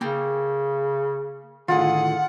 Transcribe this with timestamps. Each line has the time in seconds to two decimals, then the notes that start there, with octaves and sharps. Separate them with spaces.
0.01 C#3 A#3 G5
1.68 A2 D3 D#3 F4 G#4 F#5